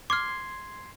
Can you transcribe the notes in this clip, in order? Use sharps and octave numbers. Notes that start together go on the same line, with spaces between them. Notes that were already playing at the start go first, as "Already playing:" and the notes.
C6 D6 F6 G#6 C7